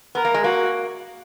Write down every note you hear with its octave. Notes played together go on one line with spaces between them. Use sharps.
B3 A#4
A#3
G#3
A#3 F#4